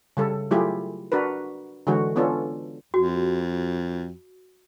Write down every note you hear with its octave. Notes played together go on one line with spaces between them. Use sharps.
C#3 G3 A4
F#3 A3 E4 F4 G4 G#4
D4 F#4 A#4 B4
D3 E3 G#3 F#4 C#5
B3 C#4 D4 F4 A4
F2 F#4